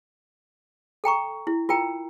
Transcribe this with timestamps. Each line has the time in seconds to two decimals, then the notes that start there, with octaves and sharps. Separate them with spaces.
1.04 A4 G5 A#5 C#6
1.47 E4
1.69 F4 A#4 G5 A#5